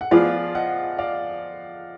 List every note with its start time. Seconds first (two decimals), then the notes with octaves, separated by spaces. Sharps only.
0.01 F#5
0.11 F3 B3 F4 G#4 D5 F5
0.55 D#5 F#5
0.99 D5 F5